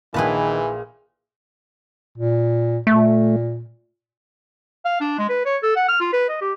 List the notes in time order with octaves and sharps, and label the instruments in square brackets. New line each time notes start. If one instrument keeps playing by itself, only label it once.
[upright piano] A#1 A#2 [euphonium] D#3 [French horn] E3 [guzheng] G#4 B4 A5
[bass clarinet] A#2
[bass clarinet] A#2 [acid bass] A3
[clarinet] F5
D4
G#3
B4
C#5
A4
F#5
F6
F4
B4
D#5
G4